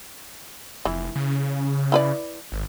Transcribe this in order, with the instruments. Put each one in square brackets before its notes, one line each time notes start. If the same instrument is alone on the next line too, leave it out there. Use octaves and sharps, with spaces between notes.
[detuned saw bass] F1 [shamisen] E3
[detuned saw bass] C#3
[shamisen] E4 B4 D5
[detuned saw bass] G#1